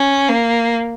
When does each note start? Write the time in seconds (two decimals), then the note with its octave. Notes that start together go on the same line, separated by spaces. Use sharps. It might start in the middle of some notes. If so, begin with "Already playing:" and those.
Already playing: C#4
0.28 A#3